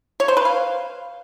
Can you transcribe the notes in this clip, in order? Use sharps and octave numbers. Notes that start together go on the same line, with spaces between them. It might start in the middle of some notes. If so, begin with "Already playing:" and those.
C#5
C5
B4
F5